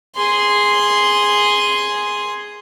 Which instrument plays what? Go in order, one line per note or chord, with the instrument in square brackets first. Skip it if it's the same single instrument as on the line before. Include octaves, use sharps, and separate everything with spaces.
[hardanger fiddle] G#4 C6